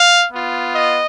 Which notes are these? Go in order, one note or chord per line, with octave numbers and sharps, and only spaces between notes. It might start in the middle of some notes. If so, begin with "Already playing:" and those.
Already playing: F5
B3 F4
D#5